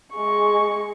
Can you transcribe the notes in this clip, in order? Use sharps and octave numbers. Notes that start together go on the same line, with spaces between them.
G#3 C#6